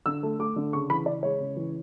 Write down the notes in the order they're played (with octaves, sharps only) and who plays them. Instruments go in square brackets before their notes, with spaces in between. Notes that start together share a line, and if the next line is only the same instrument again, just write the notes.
[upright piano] D3 E6
A3
A3 D6
D3
C#3 C#6
E3 B5
C#3 D5
G#3 C#5
C#3
E3